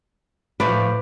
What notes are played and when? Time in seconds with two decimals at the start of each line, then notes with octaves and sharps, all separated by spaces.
0.60 A2 F3 E4 B4 D5